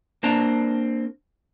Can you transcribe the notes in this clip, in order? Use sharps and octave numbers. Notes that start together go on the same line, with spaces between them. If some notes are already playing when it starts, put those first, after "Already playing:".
A#3 C4 D4 A5 A#5